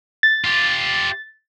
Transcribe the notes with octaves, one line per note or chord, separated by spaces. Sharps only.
A6
F4 G4